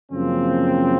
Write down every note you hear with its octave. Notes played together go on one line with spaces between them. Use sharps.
F#2 C#3 F3 A#3 C4